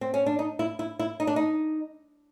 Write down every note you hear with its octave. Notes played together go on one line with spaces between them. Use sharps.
C4
C#4
D4
D#4
E4
E4
E4
D#4
D4
D#4